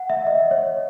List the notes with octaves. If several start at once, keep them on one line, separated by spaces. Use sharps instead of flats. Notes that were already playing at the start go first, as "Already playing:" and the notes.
Already playing: F#5
E5
D#5
C#5